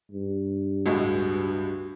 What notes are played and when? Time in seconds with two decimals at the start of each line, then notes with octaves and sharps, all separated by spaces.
0.11 G2
0.86 C#2 A2 G#3 F#4